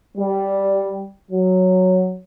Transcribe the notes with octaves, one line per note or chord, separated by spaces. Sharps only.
G3
F#3